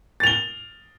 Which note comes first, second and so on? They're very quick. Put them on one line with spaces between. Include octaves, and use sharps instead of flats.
A6 F7 G7